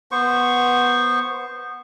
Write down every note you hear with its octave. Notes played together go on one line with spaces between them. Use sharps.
B3 C5 C#6